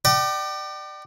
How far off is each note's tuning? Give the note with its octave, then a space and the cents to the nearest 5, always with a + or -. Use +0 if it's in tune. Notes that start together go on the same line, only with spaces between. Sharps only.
D5 +30 G5 -35 B5 -40